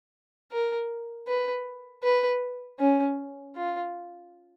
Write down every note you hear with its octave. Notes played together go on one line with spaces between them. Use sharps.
A#4
B4
B4
C#4
F4